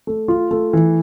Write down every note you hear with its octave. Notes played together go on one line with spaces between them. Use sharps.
A3
F4
A3
E3